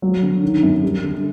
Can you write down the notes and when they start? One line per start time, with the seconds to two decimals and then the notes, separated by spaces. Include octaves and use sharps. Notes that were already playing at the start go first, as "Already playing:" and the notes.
0.02 F#3
0.22 D3
0.43 D#3
0.63 F#2
0.83 G3
1.03 D3